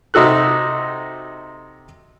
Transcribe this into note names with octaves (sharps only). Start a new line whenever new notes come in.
C3 D#4 F#4 A4 F#6